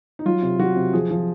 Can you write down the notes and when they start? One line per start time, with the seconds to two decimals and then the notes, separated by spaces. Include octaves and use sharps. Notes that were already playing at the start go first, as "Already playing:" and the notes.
0.19 D#4
0.25 F#3 F4
0.42 C3
0.59 F#3 F#4
0.76 C3
0.93 F3 G#4
1.11 F3